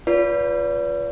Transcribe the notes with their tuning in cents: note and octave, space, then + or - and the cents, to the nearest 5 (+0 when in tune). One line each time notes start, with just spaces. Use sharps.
F4 +0 B4 +0 D5 -40